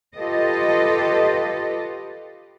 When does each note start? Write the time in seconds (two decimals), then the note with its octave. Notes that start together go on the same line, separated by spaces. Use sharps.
0.16 F4 G4 A4 B4 D#5